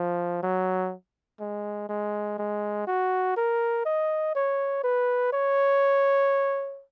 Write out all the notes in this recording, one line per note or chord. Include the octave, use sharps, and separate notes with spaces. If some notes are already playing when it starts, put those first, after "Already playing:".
Already playing: F3
F#3
G#3
G#3
G#3
F#4
A#4
D#5
C#5
B4
C#5